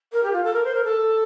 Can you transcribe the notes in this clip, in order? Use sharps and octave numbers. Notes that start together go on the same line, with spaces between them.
A#4
G4
F4
A4
A#4
C5
A#4
A4